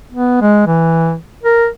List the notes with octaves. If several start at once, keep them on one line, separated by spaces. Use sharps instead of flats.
B3
G#3
E3
A#4